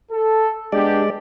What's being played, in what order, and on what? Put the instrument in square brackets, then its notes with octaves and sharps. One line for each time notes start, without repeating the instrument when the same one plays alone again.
[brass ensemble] A4
[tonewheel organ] G#3 D5 [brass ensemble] B3 D4 G4